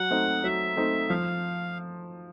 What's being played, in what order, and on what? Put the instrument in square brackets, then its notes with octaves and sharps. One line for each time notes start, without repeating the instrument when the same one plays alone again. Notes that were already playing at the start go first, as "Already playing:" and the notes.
Already playing: [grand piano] F#3 [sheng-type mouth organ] F#5
[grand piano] A3 C4 D#4
[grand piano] F#3 [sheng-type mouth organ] E5
[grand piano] A3 C4 D#4
[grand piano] F3 [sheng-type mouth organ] F5